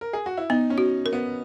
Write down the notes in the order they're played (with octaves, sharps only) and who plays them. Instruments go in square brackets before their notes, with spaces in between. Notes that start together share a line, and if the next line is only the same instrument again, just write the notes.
[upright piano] A#4
G#4
F#4
E4
[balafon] B3 [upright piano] D#4
[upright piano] C#4
[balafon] F#4
A#4
[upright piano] B3